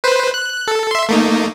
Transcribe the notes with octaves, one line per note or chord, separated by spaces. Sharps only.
B4 C5
F#6
A4
E5 C6
A3 A#3 D#4